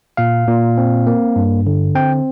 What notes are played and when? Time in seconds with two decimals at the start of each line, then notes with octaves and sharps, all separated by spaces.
0.17 A#2 F5
0.47 A#2
0.78 C4
1.07 A#3
1.36 G2
1.67 D3
1.95 C4 G5